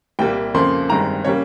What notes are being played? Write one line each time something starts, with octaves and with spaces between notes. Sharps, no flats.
C2 A#2 G3 A#3 G5
F2 C#3 F3 A#3 C6
G1 G2 D#3 G#3 C4 A#5
C#3 G3 A#3 C#5